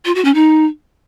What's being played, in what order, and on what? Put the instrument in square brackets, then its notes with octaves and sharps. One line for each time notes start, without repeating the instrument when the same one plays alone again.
[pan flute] F4
F#4
C#4
D#4